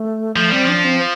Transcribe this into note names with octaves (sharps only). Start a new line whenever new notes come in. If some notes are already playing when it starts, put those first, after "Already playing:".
Already playing: A3
F3 A3
G3 C4
F3
D4
C4